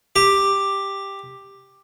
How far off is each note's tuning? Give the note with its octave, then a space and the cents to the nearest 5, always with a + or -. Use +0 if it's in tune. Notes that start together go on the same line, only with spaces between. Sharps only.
G4 +5